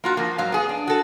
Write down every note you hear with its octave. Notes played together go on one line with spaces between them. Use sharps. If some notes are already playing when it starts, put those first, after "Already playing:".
A#3 F4 F#4
F3 A#3
G#2 F#3 F5
B3 G#4
D4
F#4 A4